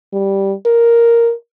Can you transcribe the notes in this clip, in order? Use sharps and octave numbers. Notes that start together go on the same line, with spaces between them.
G3
A#4